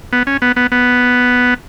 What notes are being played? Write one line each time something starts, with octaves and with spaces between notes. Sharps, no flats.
B3
C#4
B3
B3
B3